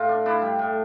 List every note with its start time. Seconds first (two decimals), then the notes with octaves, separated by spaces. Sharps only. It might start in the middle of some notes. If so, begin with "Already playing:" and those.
Already playing: A2 F4
0.09 D4
0.26 D4 E4
0.42 G3
0.59 A2